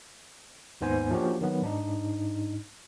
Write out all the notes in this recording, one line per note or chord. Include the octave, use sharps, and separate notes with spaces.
D#2 G#2 B3 C5 G#5
F3 A#3 C#4 D4 F#4 G4
D#3 F#3 B3
G#2 D4 D#4